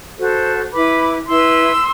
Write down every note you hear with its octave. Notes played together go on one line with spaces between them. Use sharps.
F#4 A4 C5
E4 B4 B5 D6
E4 B4 C6 E6